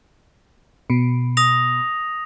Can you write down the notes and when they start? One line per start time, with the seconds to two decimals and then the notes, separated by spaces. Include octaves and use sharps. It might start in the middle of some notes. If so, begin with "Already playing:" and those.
0.90 B2
1.37 D#6 A#6 F7